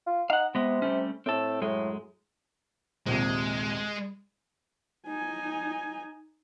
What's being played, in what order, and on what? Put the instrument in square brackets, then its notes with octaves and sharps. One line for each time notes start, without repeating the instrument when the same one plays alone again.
[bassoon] F4
[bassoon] D#4 [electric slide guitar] F5 F#5
[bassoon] C3 [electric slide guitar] G#3 B3
[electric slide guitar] G3 A3 C#4
[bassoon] A2 [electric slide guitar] C4 A4
[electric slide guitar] F#2 G#3 [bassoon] A2
[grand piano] A#1 D#2 C3 [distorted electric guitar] G#3
[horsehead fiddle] D#4 G#5